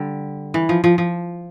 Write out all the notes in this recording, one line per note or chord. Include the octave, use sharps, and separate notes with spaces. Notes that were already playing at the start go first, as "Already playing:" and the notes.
Already playing: D3 G3
E3
F3
F3
F3